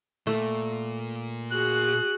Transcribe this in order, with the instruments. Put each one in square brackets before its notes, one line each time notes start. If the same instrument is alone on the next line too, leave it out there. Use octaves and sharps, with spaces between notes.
[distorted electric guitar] A#2 [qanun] A3
[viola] F#4 G#4 [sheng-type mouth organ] F#6